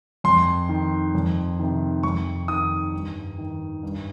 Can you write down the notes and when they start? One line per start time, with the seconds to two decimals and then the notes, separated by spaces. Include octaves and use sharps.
0.24 F2 C6
0.69 D#3
1.14 F2
1.59 C3 D#3
2.03 F2 C#6
2.48 D#3 D#6
2.94 G2
3.38 D#3
3.83 G2